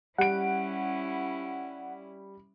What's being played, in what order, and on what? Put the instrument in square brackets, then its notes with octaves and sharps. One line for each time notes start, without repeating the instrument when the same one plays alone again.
[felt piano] G3 D7 [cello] C#4 E4 [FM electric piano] F#5